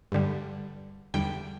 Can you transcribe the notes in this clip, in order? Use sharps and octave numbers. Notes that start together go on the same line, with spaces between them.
G2 D3 G3
E2 D3 G3 G5